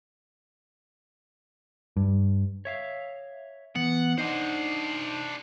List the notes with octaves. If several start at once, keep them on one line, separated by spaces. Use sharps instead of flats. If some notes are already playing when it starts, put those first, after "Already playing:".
G2
C#5 E5 F5
E3 B3 F#5
D4 D#4 C5 D#5 F#5